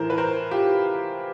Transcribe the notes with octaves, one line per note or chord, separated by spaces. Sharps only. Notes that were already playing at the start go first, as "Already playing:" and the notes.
Already playing: A2 E3 A#4 C5
B4
A#4 C5
F4 G4